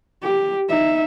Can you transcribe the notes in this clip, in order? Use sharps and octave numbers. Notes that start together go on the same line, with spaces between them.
G4
D#4 E5